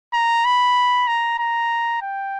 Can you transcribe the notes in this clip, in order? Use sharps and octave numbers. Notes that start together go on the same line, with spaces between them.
A#5
B5
A#5
A#5
G5